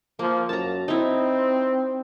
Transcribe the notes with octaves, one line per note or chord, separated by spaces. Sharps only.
F3 A#3
F#2 A5 A#5
C4 D#4 E4